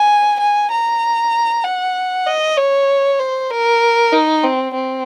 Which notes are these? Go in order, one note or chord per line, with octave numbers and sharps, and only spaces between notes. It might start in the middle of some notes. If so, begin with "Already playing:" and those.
Already playing: G#5
G#5
A#5
F#5
D#5
C#5
C5
A#4
D#4
C4
C4